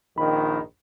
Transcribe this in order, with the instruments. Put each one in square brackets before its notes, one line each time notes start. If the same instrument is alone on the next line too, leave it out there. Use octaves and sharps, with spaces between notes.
[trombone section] A#1 D#3 [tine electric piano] B5